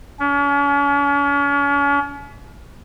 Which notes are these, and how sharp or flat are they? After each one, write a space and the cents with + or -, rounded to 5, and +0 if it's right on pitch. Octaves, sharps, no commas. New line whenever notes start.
C#4 +40